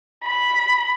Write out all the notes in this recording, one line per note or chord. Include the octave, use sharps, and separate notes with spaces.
B5